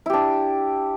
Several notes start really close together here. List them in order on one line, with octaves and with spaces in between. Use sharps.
E4 G4 D4